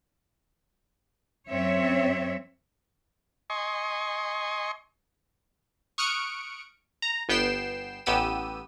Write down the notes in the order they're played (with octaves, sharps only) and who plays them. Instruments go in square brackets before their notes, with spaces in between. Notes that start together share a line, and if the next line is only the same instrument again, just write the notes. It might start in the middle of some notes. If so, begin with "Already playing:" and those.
[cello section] F#2 C4 C#5 E5
[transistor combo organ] D#5 G#5 C6 C#6
[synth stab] C#6 D#6 F6 F#6 C#7 D7
A#5
G1 B3 G5 C7 E7
A1 B3 G4 E6 D#7